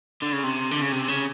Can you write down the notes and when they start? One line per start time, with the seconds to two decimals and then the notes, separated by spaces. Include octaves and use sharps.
0.22 D3
0.32 C#3
0.43 C3
0.71 D3
0.82 C#3
0.92 C3
1.08 C#3